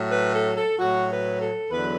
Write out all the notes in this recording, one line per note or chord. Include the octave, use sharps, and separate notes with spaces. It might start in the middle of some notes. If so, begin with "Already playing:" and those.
Already playing: A2 F#3
B4
A4
A4
A2 F#3 F#4
B4
A4
E2 D3 F#3 B4